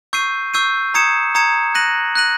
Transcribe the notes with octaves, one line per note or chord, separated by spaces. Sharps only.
C#6 E6 G6 C7 D#7
C#6 E6 G6 C7 D#7
A#5 D#6 G#6 C#7 E7
A#5 D#6 G#6 C#7 E7
F#6 A#6 D#7 F#7
F#6 A#6 D#7 F#7